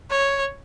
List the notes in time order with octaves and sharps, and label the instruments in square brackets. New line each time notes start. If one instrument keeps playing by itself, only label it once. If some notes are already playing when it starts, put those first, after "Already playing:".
[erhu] C#5